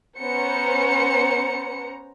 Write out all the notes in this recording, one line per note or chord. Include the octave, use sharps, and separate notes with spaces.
B3 C#4 C5 A#5 C#7